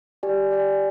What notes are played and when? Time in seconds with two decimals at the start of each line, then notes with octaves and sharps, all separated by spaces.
0.23 G4 D5 G#5
0.51 G4 D5 G#5